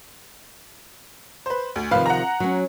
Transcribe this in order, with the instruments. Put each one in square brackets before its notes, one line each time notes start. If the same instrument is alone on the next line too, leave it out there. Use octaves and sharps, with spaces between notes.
[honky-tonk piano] B4 C5
D2
[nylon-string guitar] C3 D#3 F3 [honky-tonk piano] B4 F5
[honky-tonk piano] F#5 A#5
[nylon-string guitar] F#3 C#4